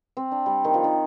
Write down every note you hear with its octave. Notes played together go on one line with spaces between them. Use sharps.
C4
D4
G3
D#3
F3
D#3